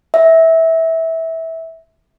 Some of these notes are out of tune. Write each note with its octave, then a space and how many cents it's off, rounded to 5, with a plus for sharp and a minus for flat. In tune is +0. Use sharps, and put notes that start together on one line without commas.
E5 -20